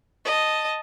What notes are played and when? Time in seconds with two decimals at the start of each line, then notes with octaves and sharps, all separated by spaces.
0.25 D#5 A5